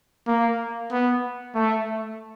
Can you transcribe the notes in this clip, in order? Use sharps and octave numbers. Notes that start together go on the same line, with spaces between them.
A#3
B3
A3